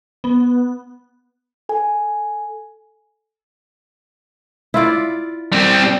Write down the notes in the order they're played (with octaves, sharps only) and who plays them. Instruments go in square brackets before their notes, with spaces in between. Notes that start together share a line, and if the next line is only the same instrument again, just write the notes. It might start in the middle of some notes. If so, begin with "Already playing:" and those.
[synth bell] B3
[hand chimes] A4 G#5
[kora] E4 F4 D5
[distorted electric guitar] G3 C4